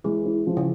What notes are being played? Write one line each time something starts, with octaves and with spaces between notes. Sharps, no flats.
E3 G#3
E4
F3
C#3